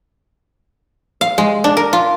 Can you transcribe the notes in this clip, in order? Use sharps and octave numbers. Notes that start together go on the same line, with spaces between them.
F5
G#3
D4
A#4
F4